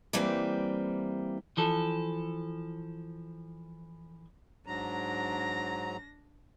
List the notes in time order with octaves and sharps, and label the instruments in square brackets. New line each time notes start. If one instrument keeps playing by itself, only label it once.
[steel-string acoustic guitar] E3 G3 A#3 C4 B4
[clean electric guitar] E3 F3 A4
[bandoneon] G#2 F#3 A#5 [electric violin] D4 A#6